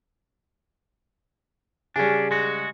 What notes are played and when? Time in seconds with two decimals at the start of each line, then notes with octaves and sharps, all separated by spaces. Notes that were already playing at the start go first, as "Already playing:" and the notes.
1.96 C#3 G3 C#4 D4 G#4 G#5
2.31 G#3 F#4